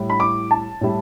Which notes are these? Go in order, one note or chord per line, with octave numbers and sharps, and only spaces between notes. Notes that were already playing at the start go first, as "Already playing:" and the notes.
Already playing: A2 G3 E4
B5
D6
A5
A2 G3 E4